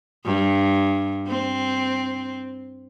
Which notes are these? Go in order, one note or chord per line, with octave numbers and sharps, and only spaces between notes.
G2
C4